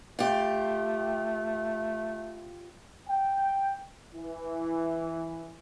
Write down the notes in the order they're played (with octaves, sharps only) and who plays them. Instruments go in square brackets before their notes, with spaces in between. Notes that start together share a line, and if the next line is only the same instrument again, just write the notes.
[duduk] A3 [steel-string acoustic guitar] F4 G4
[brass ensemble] G5
E3